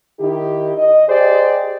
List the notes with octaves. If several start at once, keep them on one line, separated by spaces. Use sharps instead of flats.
D#3 D#4 E4 G4
D#5
G4 G#4 C5 D5 D#5